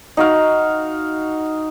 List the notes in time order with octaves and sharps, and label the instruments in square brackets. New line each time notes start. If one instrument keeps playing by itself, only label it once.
[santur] D#4 F#4 F5